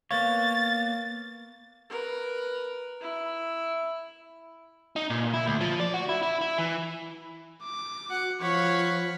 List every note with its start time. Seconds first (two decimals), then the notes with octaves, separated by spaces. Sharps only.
0.11 A#3 B3 C#5 F5 A6
1.89 A#4 B4
3.01 E4
4.96 D#4
5.10 A#2
5.34 E4
5.47 D2
5.61 F3
5.80 D5
5.94 F#4
6.09 E4
6.23 E4
6.41 E4
6.58 E3
7.62 D6
8.10 F#4 F#5
8.41 F3 C#5 F5 F#5 B5